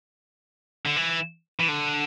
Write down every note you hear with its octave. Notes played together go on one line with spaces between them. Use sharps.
D3
E3
E3
D3